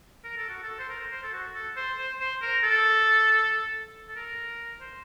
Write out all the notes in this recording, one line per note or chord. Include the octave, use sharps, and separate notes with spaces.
A#4
A4
F#4
A4
C5
A#4
C5
A4
F#4
A4
C5
C5
C5
A#4
A4
A4
A#4
C5